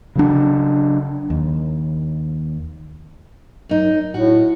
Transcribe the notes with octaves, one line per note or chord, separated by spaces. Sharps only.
C#3 F#3 D4
D#2
F#2 D#4
A2 F#4